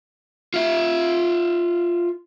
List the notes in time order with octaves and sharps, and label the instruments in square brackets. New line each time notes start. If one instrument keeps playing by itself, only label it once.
[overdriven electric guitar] F4 E5